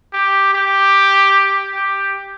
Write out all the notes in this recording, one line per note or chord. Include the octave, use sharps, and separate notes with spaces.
G4
G4
G4